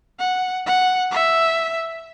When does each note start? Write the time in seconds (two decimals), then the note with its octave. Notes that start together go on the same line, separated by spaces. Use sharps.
0.20 F#5
0.66 F#5
1.12 E5